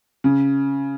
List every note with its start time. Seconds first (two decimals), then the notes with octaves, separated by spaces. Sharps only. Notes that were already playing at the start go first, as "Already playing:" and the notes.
0.24 C#3